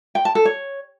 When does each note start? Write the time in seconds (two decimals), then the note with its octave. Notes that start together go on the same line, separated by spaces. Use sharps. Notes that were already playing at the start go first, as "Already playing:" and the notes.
0.15 G5
0.25 A5
0.35 A4
0.45 C#5